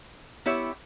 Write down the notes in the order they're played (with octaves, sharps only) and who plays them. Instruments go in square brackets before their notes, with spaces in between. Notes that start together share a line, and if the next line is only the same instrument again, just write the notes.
[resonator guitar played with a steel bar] B3 E4 G4 C#5 E5